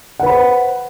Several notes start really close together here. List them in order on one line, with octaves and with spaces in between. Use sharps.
F#5 B4 B5 C5